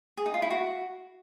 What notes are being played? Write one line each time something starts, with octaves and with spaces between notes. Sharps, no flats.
G#4
D#4
F4
E4
F#4